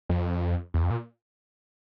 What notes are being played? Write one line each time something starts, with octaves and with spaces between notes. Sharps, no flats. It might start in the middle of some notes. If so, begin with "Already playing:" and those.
F2
E2
F2
A#2